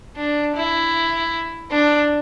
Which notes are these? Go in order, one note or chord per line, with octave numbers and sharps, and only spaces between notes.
D4
E4
D4